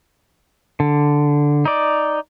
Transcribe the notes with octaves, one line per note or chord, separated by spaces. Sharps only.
D3
D#4 D5